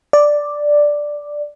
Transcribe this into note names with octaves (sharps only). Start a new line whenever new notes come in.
D5